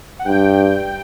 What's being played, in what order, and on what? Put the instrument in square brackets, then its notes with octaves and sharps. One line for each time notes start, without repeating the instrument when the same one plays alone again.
[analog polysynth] F#5
[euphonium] G2 [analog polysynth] G5